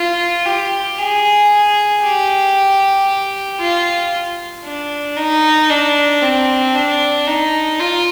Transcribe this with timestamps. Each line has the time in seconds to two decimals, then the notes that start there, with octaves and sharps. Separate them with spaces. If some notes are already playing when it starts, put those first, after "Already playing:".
Already playing: F4
0.45 G4
0.98 G#4
2.03 G4
3.60 F4
4.65 D4
5.17 D#4
5.70 D4
6.22 C4
6.75 D4
7.27 D#4
7.79 F4